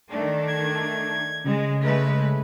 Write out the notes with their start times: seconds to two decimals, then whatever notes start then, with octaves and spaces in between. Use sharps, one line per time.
0.10 D#3 A3 D4
0.47 G#6
1.45 C#3 G#3
1.82 G#3 A3 B4